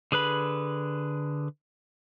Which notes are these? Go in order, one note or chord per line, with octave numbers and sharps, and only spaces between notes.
D3 G#4 B4 B5